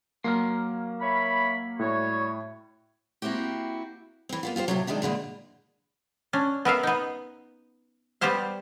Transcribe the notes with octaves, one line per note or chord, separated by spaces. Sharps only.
F#3 A#3 A#5 C6 F6
C#5 E5 B5
A2 G3 F#4 C#5
A#3 C4 E4 F#4 G4
E3 C4
A#3 B3 F4
F4 G4 G#4 C5
A2 C3 F#3
C3 D#3 G3 G#3 D4
A#2 D3 E3 G#3
C#4 D4
B3 A#4 E5 F5
B3 D#4
G3 B3 G4 C5 F5